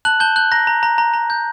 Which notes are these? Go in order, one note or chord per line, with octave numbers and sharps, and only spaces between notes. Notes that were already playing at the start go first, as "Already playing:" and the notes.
A5 F#6 F#7
A5 G6 G7
F#6 G6 F#7
A#5 F#6 A#6
A#5
A#5
A#5
A#5
G6